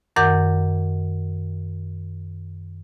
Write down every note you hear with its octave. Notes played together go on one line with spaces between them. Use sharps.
F#2 D#3 A#4 F#5 D6 G6